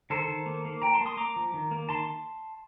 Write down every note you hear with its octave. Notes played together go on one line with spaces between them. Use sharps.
D#3 A4 C5
D#3
A#3
A#3
F3 G5 A#5
A5 C6
A#3
C6 D#6
A#3 A#5 D6
F3
D#3
A#3
D#3 A5 C6